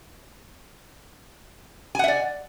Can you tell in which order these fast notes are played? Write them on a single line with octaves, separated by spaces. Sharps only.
G#5 F#5 E5 D5